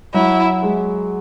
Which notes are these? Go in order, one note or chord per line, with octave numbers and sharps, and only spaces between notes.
F#3 E4
G#3